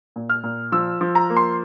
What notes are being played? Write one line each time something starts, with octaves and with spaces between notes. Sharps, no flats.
A#2
F6
A#2
F3 E6
F3
A#5
A#3
C6